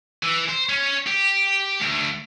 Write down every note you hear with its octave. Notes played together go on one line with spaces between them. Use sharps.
E3
C5
C#4
G4
D2